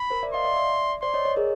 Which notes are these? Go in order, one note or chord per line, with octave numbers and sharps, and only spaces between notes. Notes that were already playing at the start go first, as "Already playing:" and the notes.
Already playing: B5
A#4 C5
D5 E5
D#5 F5 C6
D5 E5
D5 E5
C5 D5 C6
C#5 D#5
C#5 D#5
G#4 A#4